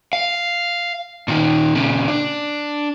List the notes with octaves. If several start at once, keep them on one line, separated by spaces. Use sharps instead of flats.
F5
A#2 D#3
A#2 C#3
D4